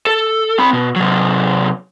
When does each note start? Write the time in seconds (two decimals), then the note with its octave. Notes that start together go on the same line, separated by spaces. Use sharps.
0.07 A4
0.59 C4 B5
0.73 B2
0.96 C3 F#3